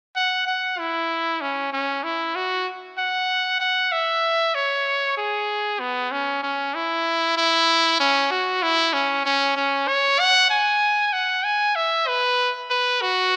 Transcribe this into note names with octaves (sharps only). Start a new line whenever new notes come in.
F#5
F#5
E4
C#4
C#4
E4
F#4
F#5
F#5
E5
C#5
G#4
B3
C#4
C#4
E4
E4
C#4
F#4
E4
C#4
C#4
C#4
C#5
F#5
G#5
F#5
G#5
E5
B4
B4
F#4